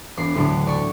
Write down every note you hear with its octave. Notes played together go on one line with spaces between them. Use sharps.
E1 D6 B6 C7
D2 A2 F#3 D6
D5 C#6